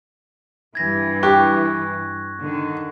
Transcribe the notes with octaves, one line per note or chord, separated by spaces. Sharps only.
G2 E3 G#6 A#6
G4 C#6 F#6
D3 D#3